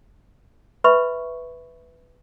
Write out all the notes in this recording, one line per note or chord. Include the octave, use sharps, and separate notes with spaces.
B4 E5 B5 C#6